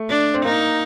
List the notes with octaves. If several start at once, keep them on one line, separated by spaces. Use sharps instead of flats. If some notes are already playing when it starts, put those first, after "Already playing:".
Already playing: A3
D4
C4
A#3 D#4